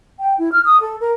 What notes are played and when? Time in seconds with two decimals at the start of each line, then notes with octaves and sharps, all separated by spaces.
0.19 G5
0.38 E4
0.52 F6
0.65 D#6
0.81 A4
1.00 A#4